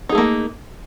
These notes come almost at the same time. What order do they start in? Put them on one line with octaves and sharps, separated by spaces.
D#4 G#4 A3 A#3